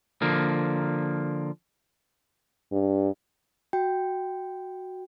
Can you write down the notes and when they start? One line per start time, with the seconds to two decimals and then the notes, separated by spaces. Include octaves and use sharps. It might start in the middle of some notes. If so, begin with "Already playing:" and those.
0.22 D3 F3 A#3
2.72 G2
3.73 F#4 G5